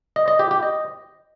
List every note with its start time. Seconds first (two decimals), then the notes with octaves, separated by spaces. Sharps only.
0.16 D#5
0.28 D#5
0.39 G4
0.51 G4
0.63 D#5